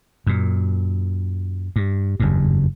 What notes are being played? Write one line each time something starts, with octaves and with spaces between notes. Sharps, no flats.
F#2 A#2
G2
F#1 E2 G2